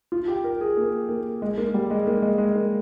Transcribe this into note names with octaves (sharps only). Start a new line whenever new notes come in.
F4
G4
A#4
G#4
A#3
A#3
G#3
A#3
G3
G#3
A#3
G#3
G#3
A#3